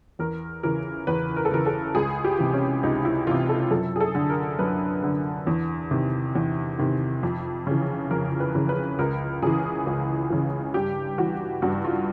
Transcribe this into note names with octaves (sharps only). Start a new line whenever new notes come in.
E2 A#4
C#3 E3 A#4
E2 B4
A#4
A4
C#3 E3 A#4
A4
C#2 G#4
G4
C3 E3
C#4
C#2 D#4
E4
C3 E3 F4
A4
F#2 A4
G#4
A4
D3
A#4
F#2 B4
D3
E2
C3 D#3
E2
C3 D#3
F2
C#3 E3
F2 A#4
B4
C#3 E3
B4
C#2 A#4
C#3 E3 G#4
C#2
C#3 E3
G2 G4
E3 F#4
G2 F#4
F4